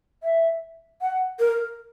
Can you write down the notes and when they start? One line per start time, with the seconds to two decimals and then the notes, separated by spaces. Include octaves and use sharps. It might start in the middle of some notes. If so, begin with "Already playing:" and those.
0.23 E5
1.01 F#5
1.40 A#4